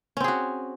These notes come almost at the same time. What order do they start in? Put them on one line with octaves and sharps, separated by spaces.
C#4 C4 G#4 F#4